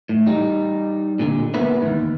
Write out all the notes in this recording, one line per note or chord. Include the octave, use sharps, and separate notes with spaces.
A2
G3 D#4
A#2 D3
A#3 B3 E4 B4
D#2 G#2